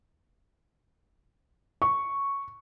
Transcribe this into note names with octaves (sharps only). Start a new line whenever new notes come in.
C#6